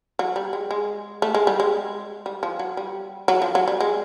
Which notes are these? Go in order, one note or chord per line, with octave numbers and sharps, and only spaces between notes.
F#3
G3
G#3
G#3
A3
G#3
G3
G#3
G3
F3
F#3
G3
F#3
F3
F#3
G3
G#3